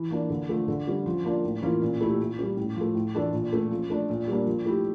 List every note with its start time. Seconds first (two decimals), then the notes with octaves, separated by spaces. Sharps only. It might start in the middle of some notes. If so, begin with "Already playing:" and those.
Already playing: E3
0.11 A#3 D4
0.30 D3
0.49 F3 A3
0.68 D3
0.87 G3 C#4
1.06 F3
1.24 A#3 D4 F4
1.43 A2
1.62 E3 A#3 C#4 F4
1.82 A#2
2.01 A3 E4 G4
2.19 A#2
2.39 G3 C#4
2.57 A2
2.76 F3 A3
2.95 A2
3.15 E3 A3 D4 A4
3.33 A#2
3.53 A3 C#4
3.71 F3
3.90 A3 D4
4.09 A#2
4.28 G3 A#3 D4
4.47 F3
4.66 A3 E4 G4